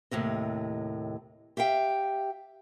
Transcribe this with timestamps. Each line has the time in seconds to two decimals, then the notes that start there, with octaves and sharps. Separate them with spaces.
0.11 D#2 A2 C3 D#5
1.57 G4 E5 F5 G5